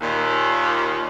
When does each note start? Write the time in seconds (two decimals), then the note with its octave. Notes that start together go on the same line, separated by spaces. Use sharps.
0.01 D#2 A#2